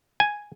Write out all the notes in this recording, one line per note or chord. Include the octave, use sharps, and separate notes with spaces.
G#5